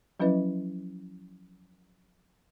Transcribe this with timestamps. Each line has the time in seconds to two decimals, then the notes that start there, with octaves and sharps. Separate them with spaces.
0.20 F3 F#3 C#4 E4 B4 D#5